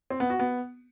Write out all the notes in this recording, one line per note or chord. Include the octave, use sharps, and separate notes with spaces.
C4
B3
F#4
B3